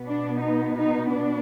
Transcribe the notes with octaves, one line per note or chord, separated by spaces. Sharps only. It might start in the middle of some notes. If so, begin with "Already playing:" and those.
Already playing: B2 B3
D4
D#4
D#4
D4